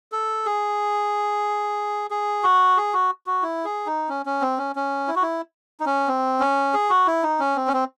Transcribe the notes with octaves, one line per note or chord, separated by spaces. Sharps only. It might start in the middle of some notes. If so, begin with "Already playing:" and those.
A4
G#4
G#4
F#4
G#4
F#4
F#4
E4
G#4
D#4
C#4
C#4
C4
C#4
C#4
E4
F#4
E4
D#4
C#4
C4
C#4
G#4
F#4
E4
D#4
C#4
C4
C#4
C4